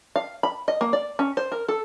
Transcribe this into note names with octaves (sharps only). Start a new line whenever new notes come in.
F5
B5
D#5
A#3
D5
C#4
C5
A#4
A4